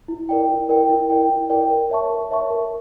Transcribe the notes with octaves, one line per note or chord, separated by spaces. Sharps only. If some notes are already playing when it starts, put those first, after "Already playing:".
E4
A#4 D5 G5
E4
A#4 D5 G5
E4
A#4 D5 G5
E4
A#4 D5 G5
A#4
C#5 E5 A5 C#6
A#4
C#5 E5 A5 C#6
A#4